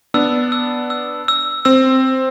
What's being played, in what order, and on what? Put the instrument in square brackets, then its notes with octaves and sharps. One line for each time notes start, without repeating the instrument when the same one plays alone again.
[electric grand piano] B3 D4 [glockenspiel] E6
[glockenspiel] E6
E6
E6
[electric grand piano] C4 [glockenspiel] E6